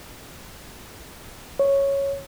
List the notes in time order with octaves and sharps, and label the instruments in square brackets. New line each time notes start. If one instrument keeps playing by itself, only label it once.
[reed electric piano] C#5